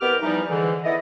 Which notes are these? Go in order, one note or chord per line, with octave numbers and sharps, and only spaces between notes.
C2 B3 G4 A#4 D6 F6
E3 F3 G3 D#4
G#2 D3 E3
B3 E4 A4 D5 D#5